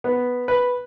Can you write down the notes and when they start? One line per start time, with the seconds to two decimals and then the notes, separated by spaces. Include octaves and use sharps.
0.04 B3
0.48 B4